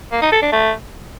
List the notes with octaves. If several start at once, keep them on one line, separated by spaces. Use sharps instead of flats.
A#3
D#4
A4
D4
A3